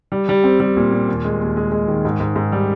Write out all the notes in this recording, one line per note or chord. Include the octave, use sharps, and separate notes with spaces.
G3
G3
C4
G3
A#2
A#2
D#2
G#3
D#2
G#3
G#3
D#3
G#2
G#2
G#2
G3